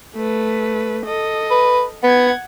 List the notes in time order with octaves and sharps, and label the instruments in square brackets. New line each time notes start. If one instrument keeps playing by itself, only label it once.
[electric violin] A3 B4
A4 D#5
[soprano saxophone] B4
[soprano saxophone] B3 [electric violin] F#5 G#6